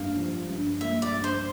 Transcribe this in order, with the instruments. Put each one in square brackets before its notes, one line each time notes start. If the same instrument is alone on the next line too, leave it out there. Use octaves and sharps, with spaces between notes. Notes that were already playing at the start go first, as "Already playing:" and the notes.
Already playing: [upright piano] G2 A#3 [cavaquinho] F5
[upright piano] F3
G2
[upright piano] A#3 [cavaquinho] E5
[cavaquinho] D5
[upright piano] G2
[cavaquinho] C5